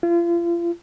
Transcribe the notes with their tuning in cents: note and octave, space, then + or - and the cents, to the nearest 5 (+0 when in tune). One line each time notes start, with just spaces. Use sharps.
F4 -35